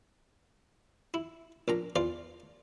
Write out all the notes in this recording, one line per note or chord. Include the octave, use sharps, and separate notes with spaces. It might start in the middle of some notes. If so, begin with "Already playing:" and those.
E4
A#1 A#2 A#5
E2 F4 D5 F5